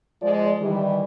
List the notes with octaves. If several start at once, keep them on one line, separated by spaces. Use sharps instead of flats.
F3 G#3 D5
D#3 E3 G3